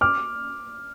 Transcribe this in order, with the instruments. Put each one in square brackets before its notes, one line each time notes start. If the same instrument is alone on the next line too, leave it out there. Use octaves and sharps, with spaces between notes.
[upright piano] D6 F6